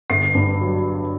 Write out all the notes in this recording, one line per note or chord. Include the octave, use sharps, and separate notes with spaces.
G1 C7
G2
F#3